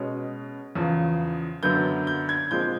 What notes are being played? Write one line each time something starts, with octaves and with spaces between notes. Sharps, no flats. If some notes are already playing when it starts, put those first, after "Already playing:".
Already playing: B2 G#3 C#4
E2 C#3 F3
F#2 D3 F#3 B3 G6
G6
G#6
A#2 F3 G#3 C4 G6